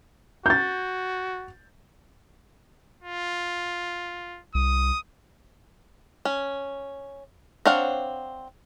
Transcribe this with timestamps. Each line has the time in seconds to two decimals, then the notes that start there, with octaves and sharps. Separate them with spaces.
0.46 F#4 G6 A6
3.03 F4
4.55 C2 D#6
6.25 C#4
7.66 C4 D4 C#5 F5 F#5